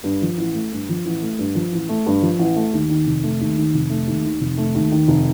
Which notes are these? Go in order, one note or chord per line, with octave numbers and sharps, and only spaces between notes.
G2
F3
A1
A3
G2
F3
A1
A3
G2
F3
A1
A3
G2
F3
A1
A3
D#2
D#3
F1
A3
D#2
D#3
F1
A3
D#2
D#3
F1
A3
D#2
D#3
F1